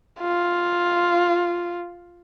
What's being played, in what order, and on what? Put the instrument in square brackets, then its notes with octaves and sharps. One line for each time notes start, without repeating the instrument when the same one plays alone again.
[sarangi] F4